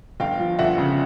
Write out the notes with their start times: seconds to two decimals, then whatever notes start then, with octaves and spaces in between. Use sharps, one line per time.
0.20 G1 F5 G5
0.39 F3
0.59 G1 E5 F#5
0.78 C#3